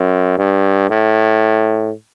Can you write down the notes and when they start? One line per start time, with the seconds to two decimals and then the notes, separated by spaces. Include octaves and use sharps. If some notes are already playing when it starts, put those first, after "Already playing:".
Already playing: F#2
0.38 G2
0.90 A2